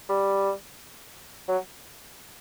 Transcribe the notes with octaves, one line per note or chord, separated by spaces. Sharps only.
G3
F#3